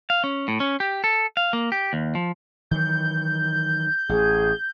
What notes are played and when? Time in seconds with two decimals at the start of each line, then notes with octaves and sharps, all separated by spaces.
0.10 F5
0.24 C#4
0.48 A2
0.60 C#4
0.80 G4
1.04 A4
1.37 F5
1.53 A#3
1.72 G4
1.93 D#2
2.15 F3
2.71 D#3 E3 F#3 G6
4.09 A1 G#4